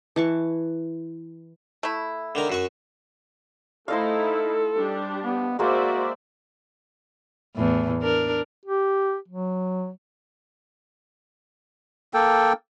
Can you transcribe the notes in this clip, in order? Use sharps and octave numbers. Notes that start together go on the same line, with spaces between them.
E3 A5 C#6
A3 E4
D3 D#3 A#4
F#2 F#4 C#6
A3 D#4 E4 A4 C5 D#5 F5
G3 D4 G4
B3
G#3 A#3 F#4 C5 D5 E5
E2 A2
D4 A#4
G4
F#3
A#3 A4 G5